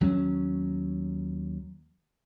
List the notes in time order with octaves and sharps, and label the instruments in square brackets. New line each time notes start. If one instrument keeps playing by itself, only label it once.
[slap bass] D#2 F#3 C4 C#4